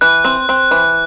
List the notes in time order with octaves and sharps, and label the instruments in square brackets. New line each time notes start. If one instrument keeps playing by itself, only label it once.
[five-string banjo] E3 [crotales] F#6
[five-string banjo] C4
C4
E3